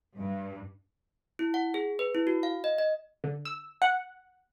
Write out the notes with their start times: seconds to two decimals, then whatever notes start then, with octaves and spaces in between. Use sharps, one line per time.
0.18 G2
1.39 E4
1.54 F#5
1.74 G#4
1.99 B4
2.15 E4
2.27 F#4
2.43 F5
2.64 D#5
2.78 D#5
3.24 D3
3.45 E6
3.82 F#5